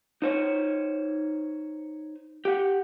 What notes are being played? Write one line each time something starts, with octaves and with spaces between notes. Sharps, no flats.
D#4 C5 C#5
G4 F#5